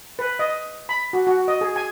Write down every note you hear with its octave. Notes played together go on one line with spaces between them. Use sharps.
B4
D#5
B5
F#4
F#4
D#5
G#4
G#5